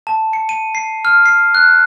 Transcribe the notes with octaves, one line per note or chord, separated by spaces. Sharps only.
A5
C#7
D#7
C7
F6
C7
F#6